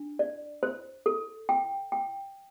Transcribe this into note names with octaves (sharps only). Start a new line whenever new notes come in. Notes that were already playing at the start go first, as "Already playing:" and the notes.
Already playing: D4
D5
C5
A4
G5
G5